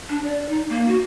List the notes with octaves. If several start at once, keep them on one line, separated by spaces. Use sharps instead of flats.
D4
D5
D#4
A#3
F#4